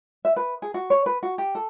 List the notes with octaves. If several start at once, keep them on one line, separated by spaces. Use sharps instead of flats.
E5
B4
G#4
F#4
C#5
B4
F#4
G4
A4